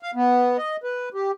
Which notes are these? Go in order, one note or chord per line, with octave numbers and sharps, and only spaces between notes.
F5
B3
D#5
B4
G4